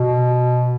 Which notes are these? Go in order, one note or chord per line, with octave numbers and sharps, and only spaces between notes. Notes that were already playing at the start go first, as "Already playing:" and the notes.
Already playing: B2